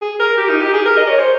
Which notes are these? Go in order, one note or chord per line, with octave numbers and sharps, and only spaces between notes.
G#4
A#4
G4
D#4
G4
G#4
A#4
D#5
C#5
C5